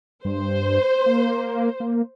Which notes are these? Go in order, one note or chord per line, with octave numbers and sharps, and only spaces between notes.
G2 C5
A#3
A#3